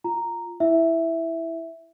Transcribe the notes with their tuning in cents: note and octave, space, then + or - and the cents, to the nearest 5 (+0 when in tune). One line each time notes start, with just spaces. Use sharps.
F4 +0 A#5 -5
E4 +0 E5 +0